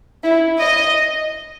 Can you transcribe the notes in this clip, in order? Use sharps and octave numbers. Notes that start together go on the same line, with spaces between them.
E4
D#5